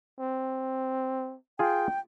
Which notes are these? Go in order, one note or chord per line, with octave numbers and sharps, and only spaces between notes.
C4
F4 G#4 G5